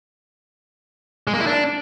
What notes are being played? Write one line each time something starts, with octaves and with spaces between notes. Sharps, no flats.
G#3
A#3
E4
D4